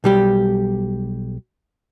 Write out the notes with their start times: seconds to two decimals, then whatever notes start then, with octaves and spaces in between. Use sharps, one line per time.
0.04 B1 G3 G4